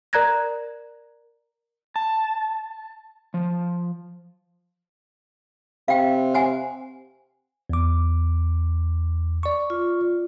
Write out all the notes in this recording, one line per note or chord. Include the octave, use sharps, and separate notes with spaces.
A#4 D5 A#5 F#6 G#6 A#6
A5
F3
C3 F5 G5
C5 F#5 G#5
E2 D6
D5 C#6
F4